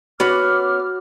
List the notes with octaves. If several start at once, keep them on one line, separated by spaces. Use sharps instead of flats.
B3 C#4 F#4 D6 F6